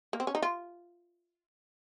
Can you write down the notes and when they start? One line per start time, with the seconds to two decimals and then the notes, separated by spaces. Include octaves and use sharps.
0.13 A#3
0.20 C4
0.27 C#4
0.35 D#4
0.42 F4